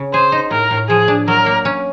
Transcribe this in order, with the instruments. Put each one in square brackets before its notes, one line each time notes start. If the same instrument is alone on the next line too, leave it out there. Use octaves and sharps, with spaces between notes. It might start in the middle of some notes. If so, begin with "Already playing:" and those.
Already playing: [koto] C#3
[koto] G#4 [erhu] C5
[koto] D#4
[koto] A2 [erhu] A#4
[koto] A2
[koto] F3 [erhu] G#4
[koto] D4
[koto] F#3 [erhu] A#4
[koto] A#3
C#4